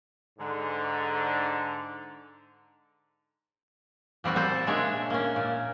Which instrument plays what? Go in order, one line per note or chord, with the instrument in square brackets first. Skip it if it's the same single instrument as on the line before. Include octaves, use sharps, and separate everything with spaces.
[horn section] G#2 D3
[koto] A#2 G3 C4 F#4
C4 A4 C5
A#2 G#3 D4 C#5 E5
A#3 C#4
A#2